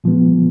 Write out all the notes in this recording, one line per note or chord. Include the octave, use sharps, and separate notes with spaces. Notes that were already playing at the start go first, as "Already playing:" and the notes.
A#2 F3 G#3 B3